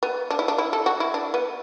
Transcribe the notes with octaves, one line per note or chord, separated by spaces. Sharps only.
B3
D4
E4
D4
E4
A4
F#4
E4
D4
B3